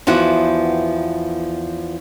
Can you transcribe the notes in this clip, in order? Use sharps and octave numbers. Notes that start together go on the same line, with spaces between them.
E2 F3 B3 E4 F#4 F#5